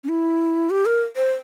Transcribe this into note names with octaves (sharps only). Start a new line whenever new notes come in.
C#4
E4
G4
A#4
C5